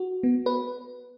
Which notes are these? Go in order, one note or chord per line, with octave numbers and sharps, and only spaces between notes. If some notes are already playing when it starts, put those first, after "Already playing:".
Already playing: F#4
B3
B4